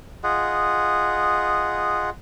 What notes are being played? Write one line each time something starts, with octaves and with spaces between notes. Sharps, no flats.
F4 G#4 D#5 F#5